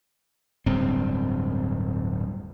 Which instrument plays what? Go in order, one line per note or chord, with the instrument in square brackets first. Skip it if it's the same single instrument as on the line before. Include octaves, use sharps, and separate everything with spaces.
[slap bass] D1 G2 C4